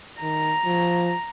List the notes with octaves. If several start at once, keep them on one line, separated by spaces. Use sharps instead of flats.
D#3 A#5
F3